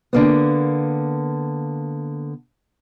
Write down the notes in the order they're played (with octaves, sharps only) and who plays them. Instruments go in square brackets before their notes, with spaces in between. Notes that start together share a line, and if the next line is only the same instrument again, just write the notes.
[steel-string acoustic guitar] D3 A#3 B3